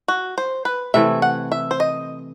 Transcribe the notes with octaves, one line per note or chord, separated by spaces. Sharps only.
F#4
C5
B4
C3 E3 A3 E4 E5
F#5
E5
C5
D#5